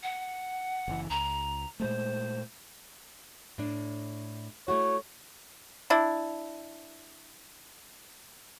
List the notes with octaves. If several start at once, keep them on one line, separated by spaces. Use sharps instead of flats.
F#5
F#1 E3
C#2 A#5
A#2 G#3 A3 C5
A2 D4
A3 E4 F#4 C#5
D4 E4